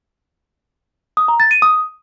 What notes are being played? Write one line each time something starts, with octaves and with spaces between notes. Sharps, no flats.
D#6
A#5
A6
D#7
D#6